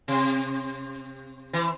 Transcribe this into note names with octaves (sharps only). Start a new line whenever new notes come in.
C3
E3